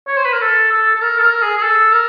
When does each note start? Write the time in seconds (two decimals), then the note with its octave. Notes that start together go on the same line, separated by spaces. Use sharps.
0.07 C#5
0.17 C5
0.25 B4
0.33 A#4
0.41 A4
0.71 A4
0.96 A4
1.02 A#4
1.18 A4
1.22 A#4
1.42 G#4
1.57 G#4
1.63 A4
1.93 A#4